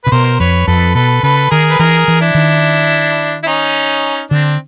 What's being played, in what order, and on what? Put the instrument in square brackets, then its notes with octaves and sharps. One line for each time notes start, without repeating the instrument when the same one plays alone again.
[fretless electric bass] C3 [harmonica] B4
[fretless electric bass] B2 [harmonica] A#4 C5
[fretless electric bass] F2 [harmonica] B4 C#5
[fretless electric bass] F2 [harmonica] A4 B4
[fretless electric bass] B2 [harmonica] A4 B4
[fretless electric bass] C#3 [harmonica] A4 B4
[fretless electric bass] D#3 [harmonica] G#4 A#4
[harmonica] B4
[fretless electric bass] E3 [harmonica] G#4 A#4
[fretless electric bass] E3
[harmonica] D4 E4
[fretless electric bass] D#3
[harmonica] E4
C#4 D#4
[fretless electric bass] D3 [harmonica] C4 D4